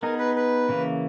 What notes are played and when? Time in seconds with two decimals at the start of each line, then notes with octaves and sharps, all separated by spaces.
0.03 B3 D#4 G#4 A#4
0.19 B4
0.36 B4
0.69 C#3 E3 A#3